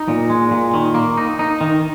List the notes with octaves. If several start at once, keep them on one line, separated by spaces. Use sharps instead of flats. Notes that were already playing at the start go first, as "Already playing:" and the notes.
Already playing: D#4
A#2
G#3
A#2
D#3
A#3
D#4
D#4
D#3